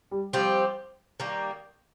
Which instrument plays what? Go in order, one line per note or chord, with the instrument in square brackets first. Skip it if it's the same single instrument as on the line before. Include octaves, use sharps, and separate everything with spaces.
[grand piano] G3
[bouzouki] F3 C4 G4 [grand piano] G3
[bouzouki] D#3 G3 A#3